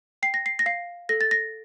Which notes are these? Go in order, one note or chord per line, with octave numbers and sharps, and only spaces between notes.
G5 C7
A#6
C7
A#6
F5 C7
A4 A#6
A6
A#6